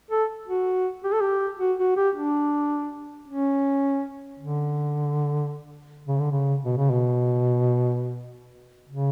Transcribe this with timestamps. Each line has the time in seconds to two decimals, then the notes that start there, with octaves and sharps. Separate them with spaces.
0.11 A4
0.48 F#4
1.04 G4
1.13 A4
1.21 G4
1.60 F#4
1.79 F#4
1.97 G4
2.16 D4
3.28 C#4
4.40 D3
6.08 C#3
6.20 D3
6.32 C#3
6.65 B2
6.77 C#3
6.90 B2
8.89 C#3